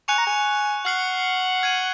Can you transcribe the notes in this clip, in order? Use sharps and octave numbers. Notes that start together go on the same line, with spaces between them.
G#5 C#6 F#6 C#7 F7
A#5
G#5
F#5 F6 C7 F#7
F6 G#6 C7 D#7